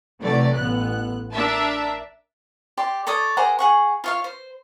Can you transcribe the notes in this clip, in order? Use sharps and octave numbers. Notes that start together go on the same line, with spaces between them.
C3 E3 F#3 A3 D5
A1 B3 F#6
D4 A#4 E5 A5
G4 D5 C6
A4 C#5 D5 D#6
G#4 A#4 C5 F#5
G#4 F#5 C#6
F4 C#5 F5
C5